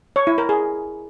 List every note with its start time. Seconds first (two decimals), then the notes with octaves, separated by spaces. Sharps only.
0.16 C#5
0.27 E4
0.38 A#4
0.49 G#4